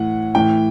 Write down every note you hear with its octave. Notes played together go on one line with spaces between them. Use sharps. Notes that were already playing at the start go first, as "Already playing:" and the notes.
Already playing: A2 E3 F#5
A2 E3 G5